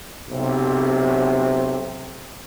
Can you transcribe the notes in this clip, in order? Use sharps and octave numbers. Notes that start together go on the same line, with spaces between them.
B1 C3